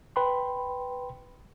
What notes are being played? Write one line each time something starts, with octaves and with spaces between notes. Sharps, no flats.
B4 G5 B5 C6